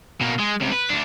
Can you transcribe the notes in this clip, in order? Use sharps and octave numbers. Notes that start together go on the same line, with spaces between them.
B2 A#3
G#3
C#2 C3
B4
D2 D4